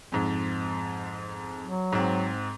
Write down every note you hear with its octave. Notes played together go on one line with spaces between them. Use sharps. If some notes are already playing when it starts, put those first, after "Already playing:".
F2 G#2
F#3
G#2 C4